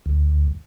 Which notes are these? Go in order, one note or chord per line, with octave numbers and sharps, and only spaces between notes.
D2